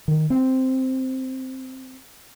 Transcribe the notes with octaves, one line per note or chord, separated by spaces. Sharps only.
D#3
C4